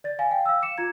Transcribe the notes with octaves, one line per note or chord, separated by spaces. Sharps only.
D5 A6
F5 G#5
F5 G5
F5 E6
D6 C#7 E7
F4 A#5 G#6